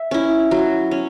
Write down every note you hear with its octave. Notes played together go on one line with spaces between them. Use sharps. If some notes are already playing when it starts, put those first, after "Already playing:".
Already playing: E5
C#4 E4
F#3
C#4